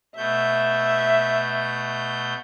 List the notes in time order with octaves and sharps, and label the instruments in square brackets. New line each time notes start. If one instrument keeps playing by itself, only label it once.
[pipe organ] B2 A3 G6 [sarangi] E5